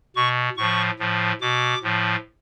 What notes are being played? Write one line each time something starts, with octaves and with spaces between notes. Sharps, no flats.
B2 C#6
A2 F3 C#6
A2 F3
B2 D6
A2 F3